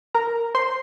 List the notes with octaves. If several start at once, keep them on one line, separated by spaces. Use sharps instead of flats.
A#4 A#5
C5 C6